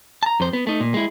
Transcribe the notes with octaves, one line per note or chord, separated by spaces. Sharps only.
A5 A#5
F2 C5
B3
A3 D#4
A#2
G#3 E4